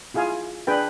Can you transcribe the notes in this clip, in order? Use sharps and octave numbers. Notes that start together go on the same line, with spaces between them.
E4 F4 G#4 F5 G#5
D4 G#4 B4 G5